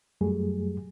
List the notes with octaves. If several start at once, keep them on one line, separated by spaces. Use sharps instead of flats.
F#2 F#3 G3 A3 G#4